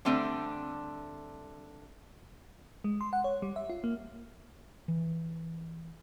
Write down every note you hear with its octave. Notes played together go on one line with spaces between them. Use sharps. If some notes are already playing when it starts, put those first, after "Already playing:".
D3 G3 A3 C4 D4
G#3
C6
F#5
C#5
G3
E5
F4
A#3
E3